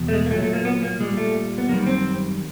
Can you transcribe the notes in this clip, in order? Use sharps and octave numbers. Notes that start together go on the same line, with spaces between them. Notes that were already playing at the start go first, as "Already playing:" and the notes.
Already playing: E2 B2
A3
G#3
A#3
A#2 F#3 A3
A3
A#3
B3
A#3
A#2 G3 G#3
A3
B3
F#2 D#3 G3 A#3
C4